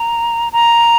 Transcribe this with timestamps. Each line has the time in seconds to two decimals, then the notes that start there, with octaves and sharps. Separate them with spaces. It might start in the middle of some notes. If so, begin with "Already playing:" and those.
Already playing: A#5
0.53 A#5